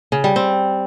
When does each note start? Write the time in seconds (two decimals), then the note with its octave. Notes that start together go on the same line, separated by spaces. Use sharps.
0.12 C#3
0.24 G3
0.36 C4